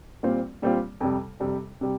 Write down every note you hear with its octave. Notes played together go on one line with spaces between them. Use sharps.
A#2 G3 C4 F4
A#2 G3 C4 F4
F2 C3 G3
F2 C3 G3
C3 G3